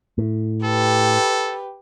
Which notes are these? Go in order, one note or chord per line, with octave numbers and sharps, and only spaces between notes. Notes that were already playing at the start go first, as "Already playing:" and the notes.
A2
G4 A4 B4